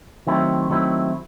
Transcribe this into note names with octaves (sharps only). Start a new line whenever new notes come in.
D#3 F#3 A3 C4 E4
D#3 F#3 A3 C4 E4